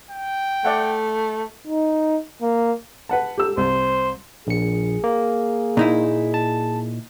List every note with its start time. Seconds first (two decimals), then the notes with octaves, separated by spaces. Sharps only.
0.11 G5
0.65 A3 D5 E5 F#5
1.68 D#4
2.42 A#3
3.09 B4 F#5 A5
3.38 G4 A4 E6
3.57 C2 C5
4.47 A#1 G#4 C#7
5.04 A#3
5.77 A#2 D#4 E4
6.34 A5